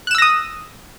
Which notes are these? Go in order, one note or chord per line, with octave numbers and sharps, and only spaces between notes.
D#6 E6 F#6 A#6 E7